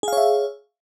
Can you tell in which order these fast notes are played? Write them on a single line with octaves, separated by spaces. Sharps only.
G#4 F5 C#5 E5